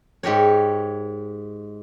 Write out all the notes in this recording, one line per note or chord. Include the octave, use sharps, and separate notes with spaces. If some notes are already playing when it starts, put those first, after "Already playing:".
G#2 G4 A#4 C#5